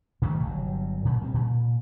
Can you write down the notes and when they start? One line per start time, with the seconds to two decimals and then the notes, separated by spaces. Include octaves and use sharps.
0.22 B2 D#3 G3 A3
0.43 G1 G2 D3 F#3
1.05 A#2
1.21 G3 C4
1.34 A#2